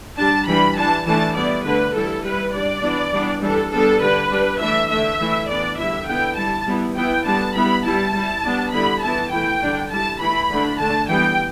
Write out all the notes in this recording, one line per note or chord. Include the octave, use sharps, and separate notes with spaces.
G3 D4 A5
E3 G3 D4 B5
E3 G3 D4 A5
E3 A3 D4 A5
G3 B3 E4 D5
D3 A3 D4 B4
E3 G3 E4 A4
G3 E4 B4
G3 D4 D5
E3 B3 D4
E3 G3 B3 D4
E3 G3 D4 A4
G3 B3 D4 A4
D3 G3 D4 B4
G3 D4
E3 A3 D4 E5
D3 A3 D4 E5
E3 A3 E4
E3 B3 D4 D5
D3 G3 E4 E5
D3 B3 E4 G5
G3 E4 A5
G3 B3 E4
E3 B3 E4 G5
D3 G3 B3 D4 A5
G3 B3 E4 B5
G3 E4 A5
G3 E4
G3 B3 D4
D3 G3 B3 E4 B5
E3 B3 E4 A5
E3 A3 E4 G5
D3 G3 D4
G3 E4 A5
E3 A3 E4 B5
D3 A3 D4
D3 A3 D4 A5
E3 G3 B3 G5